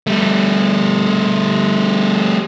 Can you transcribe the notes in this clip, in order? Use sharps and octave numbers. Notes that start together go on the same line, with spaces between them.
G3 A3